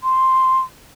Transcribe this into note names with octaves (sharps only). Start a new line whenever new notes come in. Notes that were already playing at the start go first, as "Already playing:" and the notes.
C6